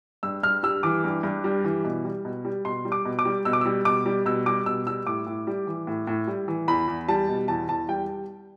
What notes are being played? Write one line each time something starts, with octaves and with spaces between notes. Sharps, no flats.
G2 E6
G2 F6
G3 E6
E3 D6
G2
G2
G3
E3
B2
G3
B2
G3
B2 C6
G3
D6
B2
D6
G3
B2 E6
D6
G3 E6
B2 D6
G3
B2 E6
G3 D6
B2 E6
G3 E6
A2 D6
A2
G3
E3
A2
A2
G3
E3
E2 B5
E2
G3 A5
B2
E2 A5
E2 A5
G3 G5